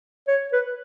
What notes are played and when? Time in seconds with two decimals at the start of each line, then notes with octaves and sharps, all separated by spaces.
0.27 C#5
0.52 B4